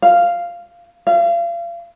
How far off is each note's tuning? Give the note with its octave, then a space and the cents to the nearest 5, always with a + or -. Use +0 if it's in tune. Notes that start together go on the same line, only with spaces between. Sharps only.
F5 -10
F5 -35